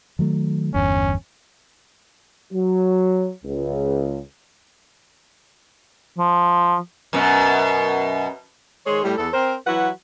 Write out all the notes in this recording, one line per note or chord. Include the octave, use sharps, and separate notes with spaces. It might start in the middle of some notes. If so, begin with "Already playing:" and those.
D#3 F#3 A3
G1 E2 G2 C#4
F#3
C#2
F3
F#2 B2
D#3 G#3 G#4 C5 C#5
A2 G3
E2 A4
C4 A#4 C5
E3 F#3 E4 F#4 B4 F#5